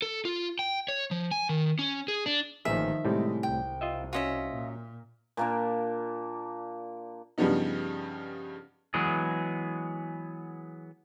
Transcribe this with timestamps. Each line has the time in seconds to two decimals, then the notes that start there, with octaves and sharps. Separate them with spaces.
0.02 A4
0.25 F4
0.59 G5
0.88 C#5
1.11 F3
1.31 G#5
1.49 D#3
1.79 C#4
2.08 G#4
2.26 D4
2.65 A1 A#2 D#3 F3 G#4 E5
3.05 A2 C3 G3 G#3
3.43 C2 G5
3.81 F4 D#5 E5
4.13 C#4 F4 F#4 D#5 E5
4.53 A#2
5.37 A#2 A#3 D4
7.38 G2 C#3 F3 G3 B3 D#4
8.94 E3 F#3 G#3 B3 G#4